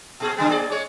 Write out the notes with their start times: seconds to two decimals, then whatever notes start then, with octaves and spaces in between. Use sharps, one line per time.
0.20 A#2 G#4
0.37 C#3 G3 B3
0.49 A#3 G#4 D5
0.71 G#3 C#5